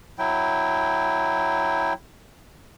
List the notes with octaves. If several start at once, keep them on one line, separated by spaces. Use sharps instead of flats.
F#3 E4 G5